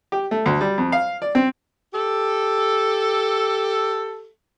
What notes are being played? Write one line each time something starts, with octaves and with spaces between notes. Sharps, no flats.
G4
A3
D2
G3
F2
F5
D5
C4
G4 A4